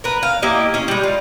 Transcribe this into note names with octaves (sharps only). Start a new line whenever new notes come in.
A#4 B4
F5
A#3 E4 G4 D#5
C#4 G#4
G3 G#3
F4